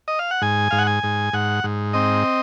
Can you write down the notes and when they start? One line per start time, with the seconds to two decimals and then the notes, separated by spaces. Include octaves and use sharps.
0.08 D#5
0.19 F5
0.31 F#5
0.42 G#2 G#5
0.71 G#2 F5
0.79 F#5
0.87 G#5
1.03 G#2
1.33 G#2 F#5
1.64 G#2
1.94 C4 D#5